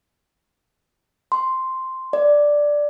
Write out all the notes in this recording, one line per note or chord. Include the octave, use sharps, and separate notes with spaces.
C6
D5